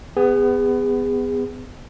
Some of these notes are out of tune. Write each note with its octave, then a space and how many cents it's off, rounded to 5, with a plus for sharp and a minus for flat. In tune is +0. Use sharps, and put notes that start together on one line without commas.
B3 +20 G#4 -25